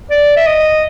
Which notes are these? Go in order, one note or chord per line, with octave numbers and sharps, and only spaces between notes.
D5
E5
D#5